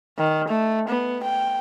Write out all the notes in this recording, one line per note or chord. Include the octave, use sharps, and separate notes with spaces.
D#3
A3
B3
G5